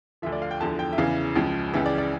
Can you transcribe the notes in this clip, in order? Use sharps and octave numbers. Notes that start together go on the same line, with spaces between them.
D2 D3 F3 E5
D5
F5
G5
E2 D3 F3 A5
G5
E5
E2 C#3 E3 F5
C#2 C#3 F3
C#2 C#3 E3 E5
D5
D5